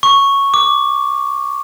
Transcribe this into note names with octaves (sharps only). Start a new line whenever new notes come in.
C#6
D6